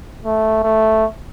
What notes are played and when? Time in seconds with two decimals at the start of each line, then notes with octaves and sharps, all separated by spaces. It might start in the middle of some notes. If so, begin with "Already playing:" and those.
0.24 A3
0.64 A3